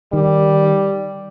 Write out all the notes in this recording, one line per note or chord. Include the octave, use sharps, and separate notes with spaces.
D#3 G3